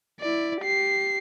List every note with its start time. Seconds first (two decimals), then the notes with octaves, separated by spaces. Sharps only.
0.20 E4 D5
0.61 G4 C7